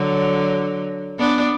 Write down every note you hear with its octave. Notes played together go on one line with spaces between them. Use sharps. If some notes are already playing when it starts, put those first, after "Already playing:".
Already playing: D3 F#3
B3 D4